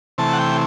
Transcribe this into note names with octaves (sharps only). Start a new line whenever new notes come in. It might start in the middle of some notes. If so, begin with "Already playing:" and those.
C3 E3 A3 A5
F#5
G5